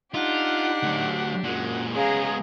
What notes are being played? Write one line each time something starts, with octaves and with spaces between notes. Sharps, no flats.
D4 D#4 F4 G4 F#5
D2 F#3
F#2 A#2 G#3 F#5
C#3 G#3 B3 G#4 F5 A#5